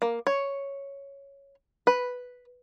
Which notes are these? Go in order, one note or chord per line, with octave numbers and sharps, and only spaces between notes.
A#3
C#5
B4